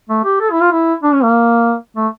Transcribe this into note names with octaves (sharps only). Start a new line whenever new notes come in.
A3
G4
A4
E4
F4
E4
D4
C#4
A#3
A3